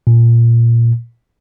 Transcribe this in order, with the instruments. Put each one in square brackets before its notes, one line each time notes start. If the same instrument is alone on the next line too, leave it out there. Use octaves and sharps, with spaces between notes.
[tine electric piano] A#2